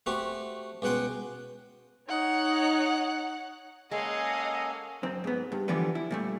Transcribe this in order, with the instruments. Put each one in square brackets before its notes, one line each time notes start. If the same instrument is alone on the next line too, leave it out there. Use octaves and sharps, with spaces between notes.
[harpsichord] A3 C4 F#4 G4
C#2 B2 F#5 G5 C6
[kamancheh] D#4 C#5 [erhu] F#5
[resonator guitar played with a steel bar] G#3 [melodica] A#3 C#4 A4 [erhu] D#5 [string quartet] F5 F#5 G#5
[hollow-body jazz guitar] F#2 C4
G#2 B3
G2
D3 E3 F3 G3 B3
E4
A#2 G3 A3